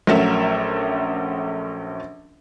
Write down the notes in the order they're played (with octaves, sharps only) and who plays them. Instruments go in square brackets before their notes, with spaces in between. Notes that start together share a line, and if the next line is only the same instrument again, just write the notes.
[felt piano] A#1 F#3 A3 C#4 A#4 E5